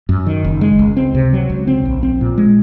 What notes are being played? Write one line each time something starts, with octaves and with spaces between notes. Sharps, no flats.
F#2
D#3
F#1
G#3
C#2
C4
C3
F#3
C#2
C4
A#1
C4
A#2
G#3